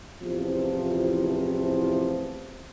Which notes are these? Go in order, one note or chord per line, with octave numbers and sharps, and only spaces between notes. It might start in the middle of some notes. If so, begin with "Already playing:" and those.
A1 E2 C3 E3 F3